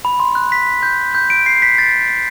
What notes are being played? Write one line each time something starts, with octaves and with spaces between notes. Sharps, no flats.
B5
C6
F#6
B6
G6
G6
D7
C7
B6
A6